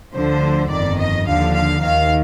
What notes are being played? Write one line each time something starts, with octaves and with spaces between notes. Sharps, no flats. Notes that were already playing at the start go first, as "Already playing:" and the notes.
D2 D3 F3 C5
G1 F2 D#3 D5
D#5
D#2 D3 F3 F5
F5
D#2 D#3 F5